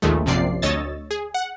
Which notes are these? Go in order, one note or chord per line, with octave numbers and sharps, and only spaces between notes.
A#1 D#2 A#2 D#3 G#3 A3
A#1 F#2 C3 F3 D5 C7
D2 C#5 D#5 E6 A6
G#4
F#5